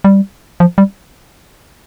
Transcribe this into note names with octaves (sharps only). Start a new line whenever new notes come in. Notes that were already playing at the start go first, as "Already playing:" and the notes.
G3
F3
G3